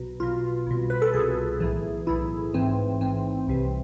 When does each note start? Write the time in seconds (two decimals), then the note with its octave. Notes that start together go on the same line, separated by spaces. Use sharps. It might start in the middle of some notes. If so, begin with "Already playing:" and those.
Already playing: B1 B2
0.20 B1 B2 F4
0.67 C2 B2
0.90 B4
1.02 A4
1.14 C2 B2 G#4
1.60 B1 A2 E3
2.07 B1 A2 E3 E4
2.54 A1 G#2 E3 C4
3.01 A1 G#2 E3 C4
3.48 C2 C3 E3